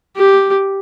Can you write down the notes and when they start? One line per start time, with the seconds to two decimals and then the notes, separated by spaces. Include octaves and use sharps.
0.17 G4